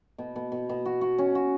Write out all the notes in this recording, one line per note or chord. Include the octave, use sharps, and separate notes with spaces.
B2
B2
B2
B2
F#4
F#4
C#4
F#4